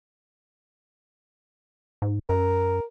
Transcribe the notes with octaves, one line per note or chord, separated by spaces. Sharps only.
G#2
F#2 A#4